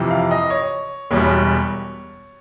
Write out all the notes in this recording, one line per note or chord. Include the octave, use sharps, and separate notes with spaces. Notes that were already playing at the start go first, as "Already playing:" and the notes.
Already playing: F2 C3 E3
F5
D#5
C#5
E1 E2 B2 G3 C#5